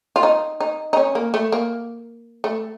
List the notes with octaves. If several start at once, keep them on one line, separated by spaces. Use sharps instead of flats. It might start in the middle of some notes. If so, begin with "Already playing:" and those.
F4
D#4
D#4
D#4
C#4
A#3
A3
A#3
A3